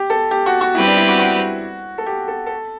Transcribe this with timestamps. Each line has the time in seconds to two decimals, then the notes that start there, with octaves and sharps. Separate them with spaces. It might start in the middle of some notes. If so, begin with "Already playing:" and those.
Already playing: G4
0.10 A4
0.31 G4
0.46 F#4
0.61 F#4
0.75 G3 C4 E4 G4 B4
0.87 D4
0.97 E4
1.09 F#4
1.19 F#4
1.98 A4
2.06 G4
2.28 A4
2.46 A4